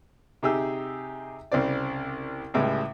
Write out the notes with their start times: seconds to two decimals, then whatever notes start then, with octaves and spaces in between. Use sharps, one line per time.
0.43 C3 D#4 G4 G#4 E6
1.52 C2 C#3 C4 D5
2.54 C#2 A2 G3 G#3